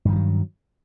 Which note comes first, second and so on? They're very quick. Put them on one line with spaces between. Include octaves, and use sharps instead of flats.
G2 D#3 E3 F#3